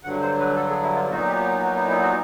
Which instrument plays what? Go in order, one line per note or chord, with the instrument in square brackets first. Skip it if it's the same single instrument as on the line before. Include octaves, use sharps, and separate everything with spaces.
[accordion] G2 D3 F#3 F#5
C5
B4
A4
G#4
E4
F4
A#2 F#3 B3 D#4 F#4
G4
F#4
E4
E4
F#4